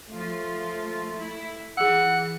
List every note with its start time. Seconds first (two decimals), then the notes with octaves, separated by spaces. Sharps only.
0.11 F3 A3 F4
1.18 E4
1.77 E3 G#4 F#5 E6